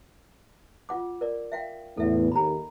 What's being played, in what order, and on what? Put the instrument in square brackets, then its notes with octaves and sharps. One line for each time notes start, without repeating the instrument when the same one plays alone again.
[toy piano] F4 F#5 D6
A#4 D5
E5 F5 G5
[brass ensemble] E2 A2 [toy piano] A4 E5
[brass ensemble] D#2 [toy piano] A#5 B5